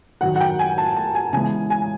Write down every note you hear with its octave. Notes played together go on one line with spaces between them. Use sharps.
F#2 D#3 F#3 F#5
F#5
G5
G#5
A5
A5
G#5
C#3 E3 G#3 B3 G#5
G#5